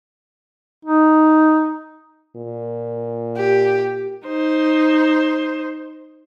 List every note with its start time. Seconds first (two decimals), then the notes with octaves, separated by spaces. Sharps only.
0.85 D#4
2.36 A#2
3.38 G4
4.26 D#4 C5